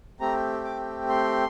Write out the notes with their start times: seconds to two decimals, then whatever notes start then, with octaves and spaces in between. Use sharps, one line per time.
0.20 A3 C4 G4 A#5
0.64 D6
1.09 C6